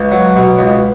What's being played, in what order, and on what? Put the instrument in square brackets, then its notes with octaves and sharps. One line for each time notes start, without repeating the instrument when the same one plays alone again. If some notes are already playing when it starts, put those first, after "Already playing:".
Already playing: [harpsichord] C#2 [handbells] B4
[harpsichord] F#3
B2
C#2